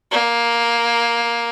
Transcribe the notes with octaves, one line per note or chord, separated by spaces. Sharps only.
A#3